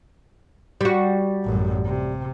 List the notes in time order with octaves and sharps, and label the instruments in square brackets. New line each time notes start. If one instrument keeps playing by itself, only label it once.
[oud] G3 F#4
[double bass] A1 F#2
C3